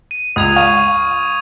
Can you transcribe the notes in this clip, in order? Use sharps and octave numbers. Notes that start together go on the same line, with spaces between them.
D#7
C#2 D#6 G#6 F7
F5 C#6